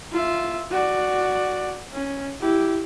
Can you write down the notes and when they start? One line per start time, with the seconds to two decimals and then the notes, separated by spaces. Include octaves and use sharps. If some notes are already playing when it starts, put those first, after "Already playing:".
0.12 F4 E5
0.71 F#4 D5
1.93 C#4
2.40 E4 G4